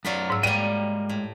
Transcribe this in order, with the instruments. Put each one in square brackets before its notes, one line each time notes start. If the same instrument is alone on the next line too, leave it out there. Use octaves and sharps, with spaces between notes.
[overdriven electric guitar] F#2 D5 [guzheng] F#3 F4 B5
[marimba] G#2 E6
[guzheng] G3 A#3 [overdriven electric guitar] G#3 G5 [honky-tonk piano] D#7
[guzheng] A2